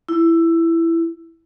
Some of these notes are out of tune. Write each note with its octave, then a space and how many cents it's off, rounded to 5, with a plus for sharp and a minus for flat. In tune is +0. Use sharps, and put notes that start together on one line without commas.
E4 +10